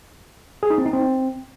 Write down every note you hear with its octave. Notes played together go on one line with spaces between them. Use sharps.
G#4
D#4
C4
D#4
C4